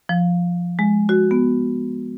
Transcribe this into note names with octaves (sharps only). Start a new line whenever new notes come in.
F3
G#3
F#4
B3